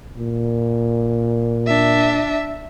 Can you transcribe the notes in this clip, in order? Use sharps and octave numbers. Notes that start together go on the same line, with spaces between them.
A#2
D4 E5